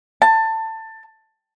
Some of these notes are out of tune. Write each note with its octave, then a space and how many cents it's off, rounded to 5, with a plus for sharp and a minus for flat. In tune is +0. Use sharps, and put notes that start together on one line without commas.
A5 +20